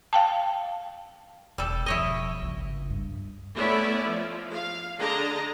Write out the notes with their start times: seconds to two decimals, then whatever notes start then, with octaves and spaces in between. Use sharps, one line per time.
0.13 F5 G5 A5
1.58 E1 G3 A4
1.86 E1 F3 E4 C#5 D#5
2.42 G1 C#2
2.90 G2
3.55 A3 B3 C#4 E4 D5 E5
4.06 F3
4.53 F5
4.98 D3 D4 G#4 D#5 A5 A#5